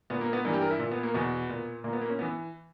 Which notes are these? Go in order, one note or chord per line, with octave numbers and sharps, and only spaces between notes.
A#2 B3
A#3
B3
G2 E3 A#3
G4
A#4
E4
A#2
B3
A#3
E2 B2 B3
A#2
A#2 A#3
B3
A#3
C#4
E3 B3